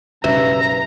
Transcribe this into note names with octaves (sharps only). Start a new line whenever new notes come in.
B1 G2 C#3 B4 E5 A#5